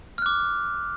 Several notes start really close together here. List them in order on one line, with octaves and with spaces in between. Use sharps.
F6 F#6 D6